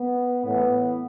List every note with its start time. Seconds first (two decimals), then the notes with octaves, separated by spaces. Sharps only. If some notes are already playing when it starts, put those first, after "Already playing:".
Already playing: B3
0.45 A2 E3 B3